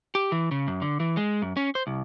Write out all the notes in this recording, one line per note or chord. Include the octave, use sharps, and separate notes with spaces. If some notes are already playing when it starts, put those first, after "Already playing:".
G4
E3
C#3
F#2
D3
E3
G#3
F#2
C#4
C5
C2